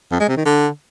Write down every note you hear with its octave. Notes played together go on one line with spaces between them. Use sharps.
F2
G#3
C3
D#3
D3